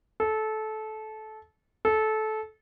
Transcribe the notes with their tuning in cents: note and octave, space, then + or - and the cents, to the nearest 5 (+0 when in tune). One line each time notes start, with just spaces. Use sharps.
A4 -20
A4 -20